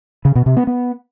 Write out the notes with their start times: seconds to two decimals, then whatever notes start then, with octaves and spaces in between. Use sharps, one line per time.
0.25 C#3
0.35 B2
0.46 C3
0.57 B3
0.67 B3